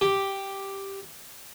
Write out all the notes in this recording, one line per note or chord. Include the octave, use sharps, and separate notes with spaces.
G4